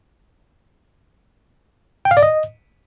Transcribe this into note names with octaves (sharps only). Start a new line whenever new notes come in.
G5
F5
D5
D#5